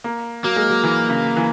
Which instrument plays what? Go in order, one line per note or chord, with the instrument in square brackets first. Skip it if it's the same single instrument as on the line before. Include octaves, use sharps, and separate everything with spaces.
[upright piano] A#3
[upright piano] F#3 [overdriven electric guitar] A#3
[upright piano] G#3
F#3
E3
C#3
E3